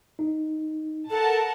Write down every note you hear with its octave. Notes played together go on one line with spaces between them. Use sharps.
D#4
A4 A#4 F#5 A5